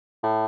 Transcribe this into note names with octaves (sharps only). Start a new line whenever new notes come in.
A2